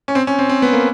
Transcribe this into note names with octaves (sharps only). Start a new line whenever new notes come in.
C#4
C4
C#4
C4
C4
B3
A#3